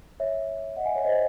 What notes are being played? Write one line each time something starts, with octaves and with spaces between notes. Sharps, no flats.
C#5 E5
D#5 F#5
E5 G#5
C#5
C5 D#5